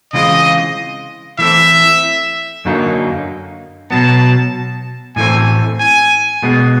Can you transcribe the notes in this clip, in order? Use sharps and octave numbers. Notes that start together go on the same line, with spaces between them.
C#3 E3 G#3 C4 F4 D#5
E3 A3 C4 E5
F#2 D3 F#3 A#3 D#4
B2 F#3 B3 A5
A2 E3 A3 C4 G#5
G#5
B2 G#3 B3